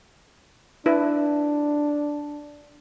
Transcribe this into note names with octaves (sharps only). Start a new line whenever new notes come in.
D4 E4 B4